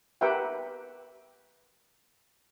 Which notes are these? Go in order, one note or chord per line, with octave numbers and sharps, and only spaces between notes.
G4 A#4 B4 E5 F#5 G5